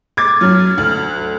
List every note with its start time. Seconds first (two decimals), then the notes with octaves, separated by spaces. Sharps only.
0.17 D6 G#6 A6
0.41 F#2 F#3 F6
0.78 D2
1.09 F#6